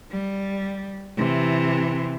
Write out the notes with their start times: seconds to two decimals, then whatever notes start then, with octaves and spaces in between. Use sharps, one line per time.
0.11 G3
1.17 C3 E3